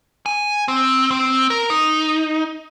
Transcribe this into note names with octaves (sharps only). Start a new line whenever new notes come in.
G#5
C4
C4
A#4
D#4